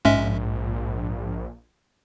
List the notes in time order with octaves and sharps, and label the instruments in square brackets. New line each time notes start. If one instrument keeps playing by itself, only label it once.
[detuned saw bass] A#1 [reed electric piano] G#2 [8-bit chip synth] G#3 C#4 E5